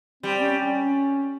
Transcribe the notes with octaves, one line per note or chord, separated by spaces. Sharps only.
G3 C4
C#4
C#4